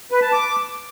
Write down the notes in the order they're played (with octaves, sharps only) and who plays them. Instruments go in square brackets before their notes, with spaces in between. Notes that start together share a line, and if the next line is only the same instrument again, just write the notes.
[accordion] B4
A5
D6